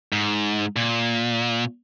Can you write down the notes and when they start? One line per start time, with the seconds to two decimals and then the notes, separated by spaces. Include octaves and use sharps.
0.12 G#2
0.76 A#2